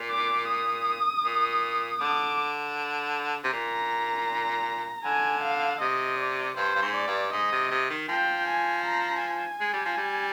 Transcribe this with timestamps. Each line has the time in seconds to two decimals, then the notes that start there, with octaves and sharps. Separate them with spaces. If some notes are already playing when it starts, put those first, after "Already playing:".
Already playing: A#2
0.10 D6
0.49 D#6
1.24 A#2
2.01 D3 D6
3.44 C3
3.53 A#2 A#5
5.04 D3 G#5
5.43 F5
5.81 C3 D#5
6.19 D5
6.57 G2 C5
6.75 G2
6.82 G#2
6.95 D5
7.07 G2
7.32 G#2 D#5
7.52 C3
7.71 C3
7.90 D#3
8.09 F3 G5
8.47 G#5
8.85 A#5
9.22 G#5
9.61 G#3
9.73 G3
9.85 F3
9.97 G3